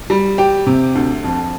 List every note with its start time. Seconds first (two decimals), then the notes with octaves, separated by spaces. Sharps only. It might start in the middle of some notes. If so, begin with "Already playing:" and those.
0.10 G3
0.38 G4
0.66 C3
0.95 D2
1.24 F2